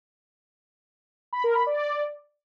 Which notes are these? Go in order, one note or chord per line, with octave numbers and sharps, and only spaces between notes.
B5
A#4
B5
D5